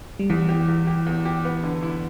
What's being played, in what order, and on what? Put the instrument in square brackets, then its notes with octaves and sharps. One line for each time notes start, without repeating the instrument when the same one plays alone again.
[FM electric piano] G3
[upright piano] E2 [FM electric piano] E3
[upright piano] G4
E2
G4
E2
G4
B3
D3
E4